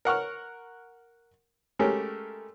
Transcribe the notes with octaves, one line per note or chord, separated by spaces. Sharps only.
A#4 F#5 C#6 F6
G#3 A3 C#4 G4 A#4